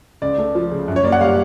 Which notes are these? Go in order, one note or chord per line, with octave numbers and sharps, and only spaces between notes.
C#2 D5
A3
F3
C#3
F#2
C#5
A#3 D5
F#5
G3 F5